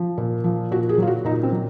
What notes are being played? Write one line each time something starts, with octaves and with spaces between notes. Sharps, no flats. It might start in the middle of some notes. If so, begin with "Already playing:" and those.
Already playing: F3
A#2
F3
A#2 F#4
G#4
F#3 F4
F#4
A#2 D#4
C4
F#3